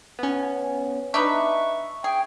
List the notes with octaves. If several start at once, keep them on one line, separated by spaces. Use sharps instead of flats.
B3 C#4
D4 D#4 B4 E5 C#6
G#4 G5